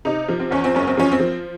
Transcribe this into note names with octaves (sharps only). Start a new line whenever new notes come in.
C3 D#4
F3
C4
E2 C#4
C4
F#1 C#4
C4
F3 C#4
C4
F3